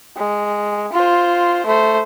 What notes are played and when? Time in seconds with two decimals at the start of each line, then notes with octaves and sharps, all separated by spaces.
0.16 G#3
0.92 F4 C5
1.66 A3 C5